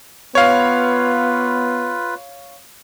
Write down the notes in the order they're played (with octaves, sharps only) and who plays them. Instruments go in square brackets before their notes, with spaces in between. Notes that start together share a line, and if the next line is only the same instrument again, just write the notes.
[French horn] B3 [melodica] F4 B4 [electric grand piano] C#5 F5